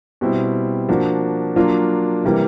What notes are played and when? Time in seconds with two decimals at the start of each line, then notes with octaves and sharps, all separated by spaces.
0.21 B2 G3 C4 E4
0.89 F3 A#3 D4 F#4
1.56 F#3 A#3 D4 F4
2.24 C3 E3 G3 A#3